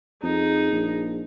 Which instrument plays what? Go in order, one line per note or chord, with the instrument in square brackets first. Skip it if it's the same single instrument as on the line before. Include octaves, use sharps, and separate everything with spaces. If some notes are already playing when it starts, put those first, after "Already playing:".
[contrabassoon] F2 [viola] D#4 G#4
[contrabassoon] A#1